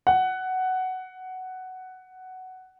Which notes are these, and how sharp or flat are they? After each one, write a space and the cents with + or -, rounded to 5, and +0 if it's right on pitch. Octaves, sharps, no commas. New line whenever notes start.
F#5 +10